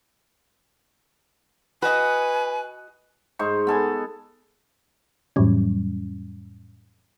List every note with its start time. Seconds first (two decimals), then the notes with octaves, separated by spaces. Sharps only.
1.82 F#4 B4 D#5 G#5
3.39 G#2 D#4 C5 C#6
3.67 B3 A4 G#5
5.36 F2 A2 E3 F#3 G3 C#4